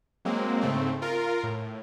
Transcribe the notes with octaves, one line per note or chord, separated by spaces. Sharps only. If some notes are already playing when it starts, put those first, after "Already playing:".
F#3 G#3 A#3 C4
G#2 C#3 A3 C4
F4 A#4
A2